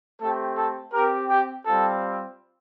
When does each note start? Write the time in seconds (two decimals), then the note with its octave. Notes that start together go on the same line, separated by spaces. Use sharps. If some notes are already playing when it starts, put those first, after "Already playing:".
0.21 A3 C4 G4 A4
0.57 A4
0.93 C4 G4 A#4
1.29 G4
1.66 G3 C4 F4 A4